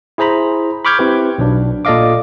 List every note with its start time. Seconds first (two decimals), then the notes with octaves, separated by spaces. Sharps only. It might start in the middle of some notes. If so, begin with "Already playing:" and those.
0.18 E4 G#4 C5 A#5 B5
0.85 B5 C#6 D6 F6 G6 G#6
0.99 C4 E4 G4 B4
1.38 B1 F#3 D4
1.85 A#2 A4 D5 D#5 F5 D6